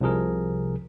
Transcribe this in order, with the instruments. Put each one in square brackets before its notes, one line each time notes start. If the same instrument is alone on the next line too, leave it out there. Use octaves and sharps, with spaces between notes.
[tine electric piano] C2 C3 F3 G#4 A#4